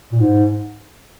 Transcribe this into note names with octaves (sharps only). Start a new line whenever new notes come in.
A#2
G#2